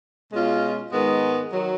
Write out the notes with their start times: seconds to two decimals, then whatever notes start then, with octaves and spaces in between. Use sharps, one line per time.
0.32 B2 G#3 C#4 F4
0.92 G#2 D#3 G#3 B3
1.52 D#3 F#3